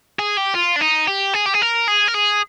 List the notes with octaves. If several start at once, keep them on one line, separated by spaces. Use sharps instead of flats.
G#4
G4
F4
D4
D#4
G4
G#4
G4
G#4
A#4
G#4
A#4
G#4